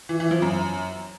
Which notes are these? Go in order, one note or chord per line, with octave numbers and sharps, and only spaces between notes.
E3
E3
F3
F#2